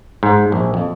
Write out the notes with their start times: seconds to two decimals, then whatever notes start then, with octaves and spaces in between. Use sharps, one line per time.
0.23 G#2
0.52 A#1
0.74 F2